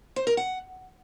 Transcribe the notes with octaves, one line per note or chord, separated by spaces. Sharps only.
C5
A#4
F#5